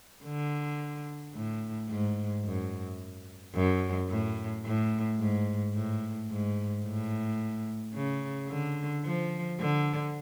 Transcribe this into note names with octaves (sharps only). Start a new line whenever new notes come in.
D3
A2
G#2
F#2
F#2
A2
A2
G#2
A2
G#2
A2
C#3
D3
F3
D3